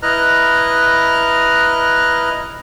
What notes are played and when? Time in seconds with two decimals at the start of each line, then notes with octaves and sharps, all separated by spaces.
0.02 E4 B4 D#5 A#5 F6 F#6